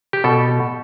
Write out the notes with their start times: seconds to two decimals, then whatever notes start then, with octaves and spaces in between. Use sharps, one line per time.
0.13 G4
0.24 B2 A4